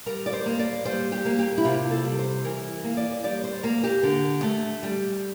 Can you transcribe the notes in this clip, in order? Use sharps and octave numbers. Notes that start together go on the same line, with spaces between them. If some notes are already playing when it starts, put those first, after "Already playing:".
G3 A#4
D5
C5
A#3
D5
G3 C5
G4
A#3
G4
E4
C3 F4
A4
G3
C5
E3 A#4
A#3
D5
G3 D5
C5
A#3 A#4
G4
D3
A3
G3